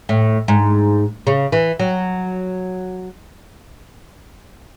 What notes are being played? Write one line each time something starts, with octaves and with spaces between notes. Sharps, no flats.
A2
G#2
C#3
E3
F#3